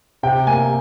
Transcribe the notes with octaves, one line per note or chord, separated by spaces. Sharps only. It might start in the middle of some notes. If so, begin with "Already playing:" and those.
C3 G5
A#3 G#5